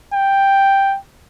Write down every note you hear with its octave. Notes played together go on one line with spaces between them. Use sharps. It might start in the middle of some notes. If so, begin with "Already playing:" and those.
G5